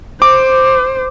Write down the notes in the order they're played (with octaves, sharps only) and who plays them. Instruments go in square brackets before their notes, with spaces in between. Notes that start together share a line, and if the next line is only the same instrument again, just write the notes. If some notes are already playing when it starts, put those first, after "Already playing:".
[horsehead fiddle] C5 [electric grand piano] D6